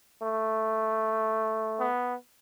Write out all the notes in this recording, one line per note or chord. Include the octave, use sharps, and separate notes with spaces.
A3
B3